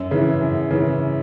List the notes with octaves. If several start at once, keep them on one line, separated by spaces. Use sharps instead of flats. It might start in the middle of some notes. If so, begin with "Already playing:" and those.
Already playing: F#2
C#3 E3
F#2
C#3 E3